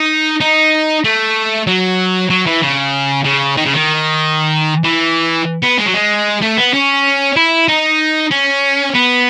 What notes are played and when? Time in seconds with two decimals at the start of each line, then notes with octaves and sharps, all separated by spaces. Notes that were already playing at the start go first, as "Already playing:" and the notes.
Already playing: D#4
0.40 D#4
1.04 A3
1.67 F#3
2.30 F#3
2.46 E3
2.62 C#3
3.25 C#3
3.57 D#3
3.65 C#3
3.73 D#3
4.84 E3
5.62 B3
5.78 G#3
5.86 F#3
5.94 G#3
6.41 A3
6.57 B3
6.73 C#4
7.36 E4
7.68 D#4
8.31 C#4
8.94 B3